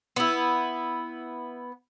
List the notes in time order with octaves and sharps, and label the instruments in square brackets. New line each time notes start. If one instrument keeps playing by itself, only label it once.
[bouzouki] B3 E4